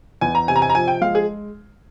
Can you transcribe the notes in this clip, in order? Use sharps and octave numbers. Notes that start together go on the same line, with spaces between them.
E2 G#5
A#5
C3 G#5
A#5
G#5
A#5
F3 G#5
G5
G#3 F5
G#4